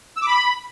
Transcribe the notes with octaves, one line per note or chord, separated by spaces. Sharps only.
E6
D6
B5